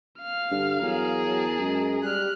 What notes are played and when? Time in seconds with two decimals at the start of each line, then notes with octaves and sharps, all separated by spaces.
0.19 F5 F6
0.51 G2 D3
0.82 E2 F#3 G#4 A#4
1.26 F#3 A5
1.59 F#2 G#3
2.03 G3 G4 F6 F#6